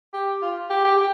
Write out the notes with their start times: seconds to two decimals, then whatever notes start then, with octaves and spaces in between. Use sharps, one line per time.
0.13 G4
0.42 F4
0.70 G4
0.84 G4
0.98 G4